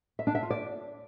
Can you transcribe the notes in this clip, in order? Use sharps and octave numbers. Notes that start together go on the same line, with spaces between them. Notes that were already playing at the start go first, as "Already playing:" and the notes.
E5
D4
E5
F4
D5